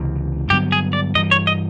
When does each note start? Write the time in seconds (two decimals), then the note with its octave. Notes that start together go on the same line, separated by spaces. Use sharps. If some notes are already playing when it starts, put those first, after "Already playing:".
Already playing: C#2 C3 E3
0.50 G2 D3 F#3 B3 G4
0.72 G#4
0.93 D5
1.15 G2 E3 G3 D#5
1.31 C#5
1.47 D#5